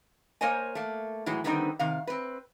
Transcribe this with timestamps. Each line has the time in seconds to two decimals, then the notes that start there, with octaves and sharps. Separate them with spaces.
0.41 A#3 A#4 C5 C#5 D#5 G#5
0.75 A3 A#3
1.26 A2 E3 F#3 G#3
1.44 D3 D#3 G3 B3 C4 D#4
1.79 C3 D#3 F5
2.07 C4 B4